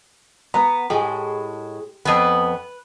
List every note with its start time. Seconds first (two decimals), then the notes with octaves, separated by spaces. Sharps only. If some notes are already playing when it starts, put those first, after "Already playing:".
0.54 B3 B4 A#5
0.90 A2 G#3 G4 C5 G#5
2.05 F2 B3 B4